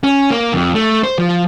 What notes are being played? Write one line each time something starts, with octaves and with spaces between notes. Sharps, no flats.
C#4
A#3
F2
A3
C5
F3